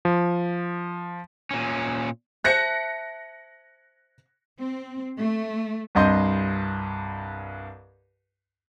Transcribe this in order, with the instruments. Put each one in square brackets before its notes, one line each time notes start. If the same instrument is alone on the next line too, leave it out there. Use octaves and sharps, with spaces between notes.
[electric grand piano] F3
[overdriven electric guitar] A#2 C#4
[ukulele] C5 E5 A5 [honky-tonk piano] F#6 A#6 C#7
[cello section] C4
A3
[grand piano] C2 G2 D#5 C6 G6